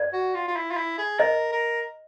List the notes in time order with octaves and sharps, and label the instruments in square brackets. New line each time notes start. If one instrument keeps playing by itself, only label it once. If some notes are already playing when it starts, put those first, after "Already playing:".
Already playing: [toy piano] D5
[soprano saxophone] F#4
F4
F4
E4
F4
E4
G#4
[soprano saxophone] A#4 [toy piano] D#5
[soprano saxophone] A#4